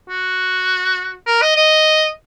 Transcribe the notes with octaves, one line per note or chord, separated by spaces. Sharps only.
F#4
A#4
D#5
D#5